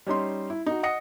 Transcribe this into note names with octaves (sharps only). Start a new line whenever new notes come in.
G3 C#4 D#4 C6
E4
D#4 F#4
D#5 F#5 D#6 A#6 C#7